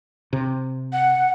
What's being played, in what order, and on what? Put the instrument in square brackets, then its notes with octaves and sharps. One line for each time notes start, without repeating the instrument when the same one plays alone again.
[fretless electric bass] C3
[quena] F#5